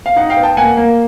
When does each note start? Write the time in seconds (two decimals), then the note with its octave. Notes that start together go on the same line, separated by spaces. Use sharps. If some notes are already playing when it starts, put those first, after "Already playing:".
0.06 F5
0.16 D#4 F#5
0.30 F5 G5
0.37 B3
0.43 G5 A5
0.57 A#3 F#5 G#5
0.77 A#3